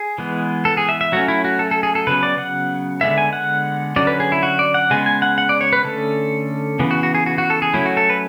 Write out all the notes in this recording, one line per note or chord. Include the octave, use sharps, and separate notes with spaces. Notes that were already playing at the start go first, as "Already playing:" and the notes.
Already playing: G#4
E3 G#3 B3
A4
G#4
E5
E5
F#3 A3 C#4 F#4
E4
F#4
A4
A4
G#4
A4
C#3 F#3 B3 B4
D5
F#5
D3 G#3 B3 E5
G#5
F#5
D3 F#3 C#4 D5
B4
G#4
E4
F#4
D5
F#5
C#3 G#3 B3 G#5
G#5
F#5
F#5
D5
C#5
B4
D3 A3 C#4 A4
C#3 E3 B3
F#4
F#4
G#4
F#4
F#4
A4
G#4
F#3 A3 C#4 E4
F#4
A4
B4